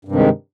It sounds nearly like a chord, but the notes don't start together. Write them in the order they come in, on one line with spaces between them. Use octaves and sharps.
G2 C3 D#3 G#3